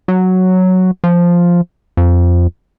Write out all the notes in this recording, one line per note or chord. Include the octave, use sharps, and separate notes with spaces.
F#3
F3
F2